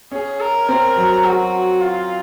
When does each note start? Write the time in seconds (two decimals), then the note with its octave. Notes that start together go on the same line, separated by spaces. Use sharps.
0.12 C#4 G#4
0.40 A#4
0.69 C4 A#4
0.96 F#3
1.25 F#4
1.81 F4